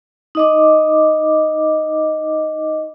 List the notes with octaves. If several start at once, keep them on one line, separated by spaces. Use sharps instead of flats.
D#4 D#5 D6